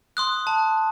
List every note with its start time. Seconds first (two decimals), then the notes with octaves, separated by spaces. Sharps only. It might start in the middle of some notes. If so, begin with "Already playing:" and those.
0.17 C6 D#6 F#6
0.47 A5